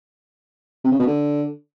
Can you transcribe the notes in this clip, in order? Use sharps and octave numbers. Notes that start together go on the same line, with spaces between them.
C3
C#3
B2
D3